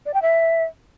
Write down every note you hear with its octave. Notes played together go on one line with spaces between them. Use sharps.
D5
G5
E5